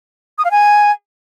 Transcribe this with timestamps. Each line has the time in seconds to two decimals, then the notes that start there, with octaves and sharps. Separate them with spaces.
0.38 D#6
0.44 F5
0.51 G#5